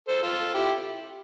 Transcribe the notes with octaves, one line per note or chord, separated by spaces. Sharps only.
A4 C5
F4 A4
E4 G4